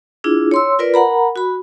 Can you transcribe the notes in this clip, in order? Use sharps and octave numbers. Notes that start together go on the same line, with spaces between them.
D4 E4 F4 G#4
C#5 C6 E6
F4 A#4 B4 D5
A#4 F#5 A#5 B5
F#4 B5